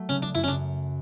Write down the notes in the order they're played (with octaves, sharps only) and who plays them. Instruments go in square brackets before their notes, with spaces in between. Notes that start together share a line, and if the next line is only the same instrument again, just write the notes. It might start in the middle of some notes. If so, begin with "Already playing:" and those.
Already playing: [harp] F#3 A3
[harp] C#3 [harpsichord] C#4
[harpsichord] D4
[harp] F#2 [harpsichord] E4
[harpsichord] C#4
D4